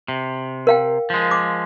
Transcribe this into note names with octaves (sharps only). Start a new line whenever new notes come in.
C3
A#4 F5 G5
F3 G#3
D6